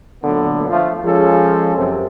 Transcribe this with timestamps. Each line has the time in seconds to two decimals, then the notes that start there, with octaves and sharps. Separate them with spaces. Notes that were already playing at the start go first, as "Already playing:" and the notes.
0.23 A#2 D3 F#3 A3 B3
0.69 F3 A3 F4
1.05 F3 G#3 C#4 F4 G#4 A4
1.76 F#2 C3